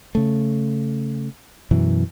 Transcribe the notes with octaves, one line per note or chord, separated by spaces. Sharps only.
C#3 A3
F#2 B2 E3 F#3